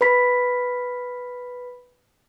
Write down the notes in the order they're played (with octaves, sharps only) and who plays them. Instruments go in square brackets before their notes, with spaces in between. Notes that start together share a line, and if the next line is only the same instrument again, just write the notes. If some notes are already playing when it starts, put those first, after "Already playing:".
[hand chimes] B4 B5 B6